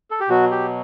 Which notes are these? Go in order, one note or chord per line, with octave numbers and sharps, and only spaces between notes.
A4
G4
B2 F#3 F#4
G4